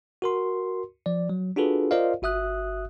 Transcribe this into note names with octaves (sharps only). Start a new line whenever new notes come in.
F#4 A#4 C6
F3 D5
F#3
D4 F4 F#4 G#4 A4 B4
F4 A#4 C5 D5 D#5 F5
G1 F#4 E5 D#6 F#6